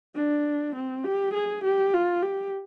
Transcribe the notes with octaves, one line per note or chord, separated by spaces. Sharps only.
D4
C4
G4
G#4
G4
F4
G4